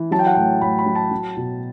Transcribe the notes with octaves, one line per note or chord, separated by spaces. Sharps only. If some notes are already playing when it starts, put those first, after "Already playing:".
Already playing: E3
F#3 A5
G5
F#5
A2 G5
A2 B5
B5
F#3
A5
F#3
B2